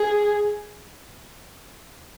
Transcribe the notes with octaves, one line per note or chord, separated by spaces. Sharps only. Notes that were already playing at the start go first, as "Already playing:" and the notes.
Already playing: G#4